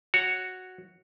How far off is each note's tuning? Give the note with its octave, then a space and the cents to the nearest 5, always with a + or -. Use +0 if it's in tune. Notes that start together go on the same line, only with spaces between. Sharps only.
F#4 +0 C#5 +0